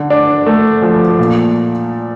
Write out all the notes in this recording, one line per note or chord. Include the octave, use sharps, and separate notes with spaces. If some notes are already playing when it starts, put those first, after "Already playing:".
Already playing: D3
D4
A3
F3
A#2